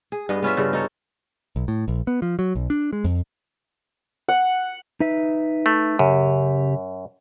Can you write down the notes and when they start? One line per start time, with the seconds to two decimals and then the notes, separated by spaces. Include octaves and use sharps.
0.12 G#4
0.29 G2 B3 G#4 D#5
0.43 B3 C#4 F4 E5
0.57 G2 C#3 A4
0.73 D#4 A4 C#5
1.56 B1
1.68 A2
1.88 A#1
2.07 B3
2.22 F3
2.39 F#3
2.55 B1
2.70 D4
2.93 G#3
3.04 F2
4.28 F#5
5.00 D#4 B4 E5
5.66 A3
5.99 F#2 C#3 G4